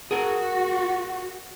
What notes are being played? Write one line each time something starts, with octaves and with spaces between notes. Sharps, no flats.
F#4 G#4 A#4 F#5